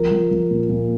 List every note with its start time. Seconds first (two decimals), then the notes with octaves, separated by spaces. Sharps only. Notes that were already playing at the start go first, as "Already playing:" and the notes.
Already playing: F3 A#4
0.11 F3
0.31 F3
0.51 A#2
0.69 A#2